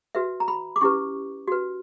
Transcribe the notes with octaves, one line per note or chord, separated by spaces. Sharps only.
F#4 B4 E5
A#5
B5
D6
C#4 E4 G4 B4 C#6
F#4 B4